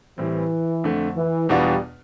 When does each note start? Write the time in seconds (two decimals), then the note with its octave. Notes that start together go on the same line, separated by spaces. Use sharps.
0.18 A2 E3 G3 C4
0.84 F2 D3 A3
1.16 E3
1.49 E2 B2 G3 B3 D4 F4